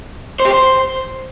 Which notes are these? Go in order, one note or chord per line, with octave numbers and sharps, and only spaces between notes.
C5
G4
C5